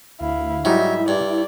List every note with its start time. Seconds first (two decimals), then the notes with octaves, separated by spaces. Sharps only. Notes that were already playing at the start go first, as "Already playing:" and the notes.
0.21 D2 E4 F5
0.65 G#2 F#3 G3 D#4 E4 E5
1.08 G2 D5